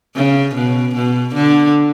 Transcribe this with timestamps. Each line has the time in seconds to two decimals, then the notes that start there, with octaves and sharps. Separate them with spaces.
0.16 C#3
0.55 B2
0.95 B2
1.34 D3